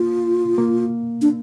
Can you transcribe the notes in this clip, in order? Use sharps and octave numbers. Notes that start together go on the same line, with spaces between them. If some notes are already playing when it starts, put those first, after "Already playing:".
Already playing: A#3 F4
A#3
D4